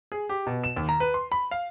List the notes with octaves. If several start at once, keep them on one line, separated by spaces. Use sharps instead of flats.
G#4
G4
B2
E7
D#2
A#5
B4
C6
B5
F5